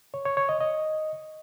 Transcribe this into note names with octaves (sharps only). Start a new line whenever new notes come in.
C#5
C#5
C#5
D#5
D#5